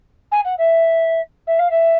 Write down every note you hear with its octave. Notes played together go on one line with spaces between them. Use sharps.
G#5
F#5
E5
E5
F5
E5